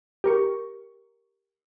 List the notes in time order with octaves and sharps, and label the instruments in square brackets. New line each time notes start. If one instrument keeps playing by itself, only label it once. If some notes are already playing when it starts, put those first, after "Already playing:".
[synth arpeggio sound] G4 A#4 C#6